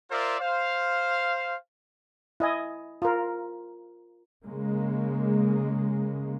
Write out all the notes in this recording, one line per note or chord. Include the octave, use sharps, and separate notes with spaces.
F4 A#4 C5 D5 E5
C5 F5
E4 D#5 G#5
F4 A#4
C#3 G#3 A#3